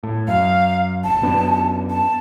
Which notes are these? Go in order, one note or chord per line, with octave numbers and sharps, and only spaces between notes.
A2
F#2 F5
F1 A5
F#2 B3 D4
A5